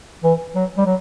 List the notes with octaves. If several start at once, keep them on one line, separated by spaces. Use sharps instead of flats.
E3
F#3
G3
F#3